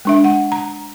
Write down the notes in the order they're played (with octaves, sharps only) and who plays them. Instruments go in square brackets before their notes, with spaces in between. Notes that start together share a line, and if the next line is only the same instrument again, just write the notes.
[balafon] G#3 D4 E5
F#5
A#5